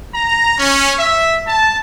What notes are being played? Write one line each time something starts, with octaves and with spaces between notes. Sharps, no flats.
A#5
C#4
E5
A5